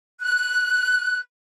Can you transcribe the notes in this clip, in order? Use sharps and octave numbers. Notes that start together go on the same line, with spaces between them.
F#6